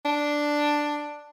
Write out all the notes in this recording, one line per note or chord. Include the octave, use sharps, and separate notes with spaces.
D4